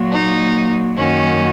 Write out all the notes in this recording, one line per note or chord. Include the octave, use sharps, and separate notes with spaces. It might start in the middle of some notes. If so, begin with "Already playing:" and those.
Already playing: A#2 F#3 A#3
D#4
F#2 D#3 F#3 A#3 C#4